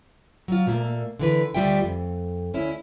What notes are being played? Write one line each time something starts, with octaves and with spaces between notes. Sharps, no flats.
F#3 F4
A#2 A3 A#3
D3 E3 B4
D2 F#3 G3 F4 E5 G5
F2
D2 C#4 E4